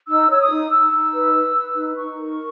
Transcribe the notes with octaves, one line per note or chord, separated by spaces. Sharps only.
D#4 E6
C#5 E6
D#6
D#4
D#4 E6
D#4
B4
B4
B4
D#4
D#4 C#6
A#4